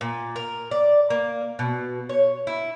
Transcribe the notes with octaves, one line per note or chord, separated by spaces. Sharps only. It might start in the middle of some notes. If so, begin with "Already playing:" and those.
A#2
A#4
D5
A#3
B2
C#5
E4